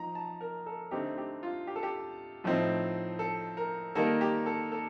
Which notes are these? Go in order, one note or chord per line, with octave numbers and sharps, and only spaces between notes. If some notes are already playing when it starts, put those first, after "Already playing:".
Already playing: F3 D#4 A#5
A5
A#4
A4
D3 A3 C4 D#4 G4
G4
F4
G4
A4
G4
A2 F3 A3 C4 D#4
A4
A#4
D#3 G3 A#3 D#4 A4
G4
A4
A4